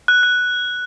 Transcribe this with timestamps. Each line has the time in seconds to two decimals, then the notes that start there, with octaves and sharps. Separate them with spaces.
0.08 F#6
0.23 F#6